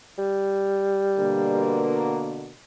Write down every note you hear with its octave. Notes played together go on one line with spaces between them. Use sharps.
G3
B2 D3 A#3